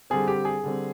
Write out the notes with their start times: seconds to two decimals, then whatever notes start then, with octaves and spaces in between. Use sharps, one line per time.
0.10 D3 G3 C4 G#4
0.28 G4
0.45 G#4
0.63 D3 G3 C4